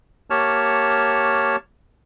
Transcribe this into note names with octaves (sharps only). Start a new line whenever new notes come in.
A#3 G4 C#5 A5 C#6 F6